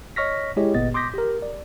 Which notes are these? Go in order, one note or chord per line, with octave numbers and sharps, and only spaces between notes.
C#5 D#5 C#6 F6 A#6 B6
G#3 E4 G4 G#4 C#5 D#5
G1 A#2 B3 D#5 A6
C6 D6 D#6 G6 A#6 B6
G4 A#4
D5